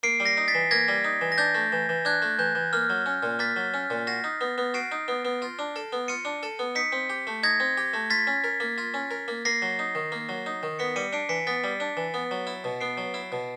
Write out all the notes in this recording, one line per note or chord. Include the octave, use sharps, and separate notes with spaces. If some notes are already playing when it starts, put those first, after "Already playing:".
A#3 C7 D7
G3
A#6 C7
D#4
A6 B6
E3
A#3 G#6 A#6
G3
D#4
E3
A#6
D4 G6 A6
A3
E3
E3
D4 F#6 G#6
A3
E3 G6
E3
A#3 F6
F#3
C#4
A#2
A#3 A6 B6
F#3
C#4
A#2
F#4 A#6 C7
D#4
B3
B3
F#4 C7 D7
D#4
B3
B3
F4
D4
A4
B3
F4 C#7 D#7
D4
A4
B3
D#4 B6 C#7
C4
G4
A3
D#4 G#6 A#6
C4
G4
A3
F4 A6 B6
C#4
A#4
A#3
F4
C#4
A#4
A#3
A#3 A#6 C7
F#3
D#4
D#3
A#3
F#3
D#4
D#3
B3 B6 C#7
G3 C#7 D#7
D4 C7 D7
E3 B6 C#7
B3 A6 B6
G3
D4
E3
B3
F#3
E4
B2
B3 C7 D7
F#3
E4
B2